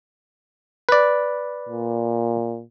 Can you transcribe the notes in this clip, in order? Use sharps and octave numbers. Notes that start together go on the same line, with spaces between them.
B4 D5
A#2